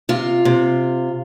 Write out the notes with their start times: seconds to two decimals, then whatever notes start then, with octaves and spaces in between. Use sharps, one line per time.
0.09 C3 F4
0.45 C3